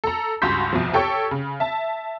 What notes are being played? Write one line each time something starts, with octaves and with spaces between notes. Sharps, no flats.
A4 A#5
C#2 G2 F#4 C6 G6 B6
C2 F2 B2 F3
G4 A4 C#5 G5 C#6
C#3
E5 A5